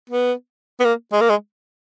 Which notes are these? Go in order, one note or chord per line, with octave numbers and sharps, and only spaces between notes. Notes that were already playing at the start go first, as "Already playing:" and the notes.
B3
B3
A#3
G#3
A#3
G#3